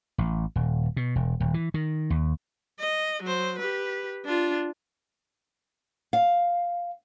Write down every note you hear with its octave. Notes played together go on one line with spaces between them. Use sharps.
A1
D#1
B2
E1
D#1
E3
D#3
D#2
D#5
F#3 C5
G4 B4
D4 F4
F5